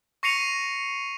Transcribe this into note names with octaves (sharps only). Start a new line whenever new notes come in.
C#6 A#6 C7 C#7 D#7 F7